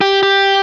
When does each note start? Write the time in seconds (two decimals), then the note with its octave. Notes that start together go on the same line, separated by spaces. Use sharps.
0.01 G4
0.23 G4